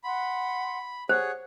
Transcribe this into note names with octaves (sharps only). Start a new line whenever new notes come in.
F#5 B5 C6
G4 G#4 C5 C#5 F#5 F#6